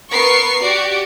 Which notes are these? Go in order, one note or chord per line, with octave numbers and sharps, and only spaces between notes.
B3 A#4 C#6 C7
F#4 G4 D5